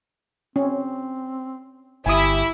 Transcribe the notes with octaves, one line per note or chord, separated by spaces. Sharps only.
C4 C#4
G1 E4 G4 G#5 D#6